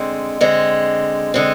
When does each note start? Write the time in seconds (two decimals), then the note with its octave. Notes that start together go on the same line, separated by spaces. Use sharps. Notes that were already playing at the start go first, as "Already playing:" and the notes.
Already playing: D3 G#3 C4
0.41 D3 G#3 C4
1.34 D3 G#3 C4